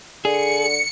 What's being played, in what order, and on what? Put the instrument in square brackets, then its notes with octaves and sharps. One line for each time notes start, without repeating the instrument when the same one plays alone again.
[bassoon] D3 [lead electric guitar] G#4 [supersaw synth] C#7